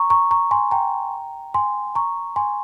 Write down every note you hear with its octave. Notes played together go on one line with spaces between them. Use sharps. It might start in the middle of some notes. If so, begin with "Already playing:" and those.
Already playing: A#5 C#6
A#5 C#6
A#5 C#6
G#5 C6
G5 A#5
G#5 C6
A#5 C#6
G#5 C6